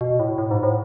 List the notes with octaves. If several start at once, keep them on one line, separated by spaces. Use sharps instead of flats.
B2
A2
A2
G#2
A2